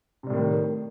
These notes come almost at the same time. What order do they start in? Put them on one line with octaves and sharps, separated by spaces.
C3 G3 A2 D#3